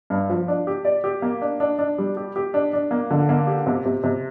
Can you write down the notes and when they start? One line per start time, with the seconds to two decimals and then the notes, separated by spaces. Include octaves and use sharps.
0.10 G2
0.30 F3
0.48 D4
0.67 G4
0.85 D5
1.04 G4
1.22 A#3
1.41 D4
1.60 D4
1.79 D4
1.98 G3
2.17 G4
2.36 G4
2.54 D4
2.73 D4
2.91 A#3
3.11 D3
3.29 A#3
3.47 G4
3.67 C3
3.86 C3
4.04 C3